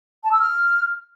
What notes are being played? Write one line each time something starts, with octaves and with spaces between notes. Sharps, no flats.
A5
E6
F6